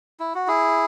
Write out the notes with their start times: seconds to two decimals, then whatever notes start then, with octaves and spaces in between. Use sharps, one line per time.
0.20 E4
0.35 F#4
0.47 E4 G#4